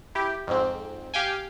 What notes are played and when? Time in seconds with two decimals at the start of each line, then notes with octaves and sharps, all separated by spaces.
0.15 E4 G4
0.47 F2 G#2 C4
1.14 G4 F5 G5 G#5